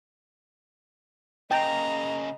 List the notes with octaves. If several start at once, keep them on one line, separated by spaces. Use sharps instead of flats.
C#3 A#3 D#5 G5 A#5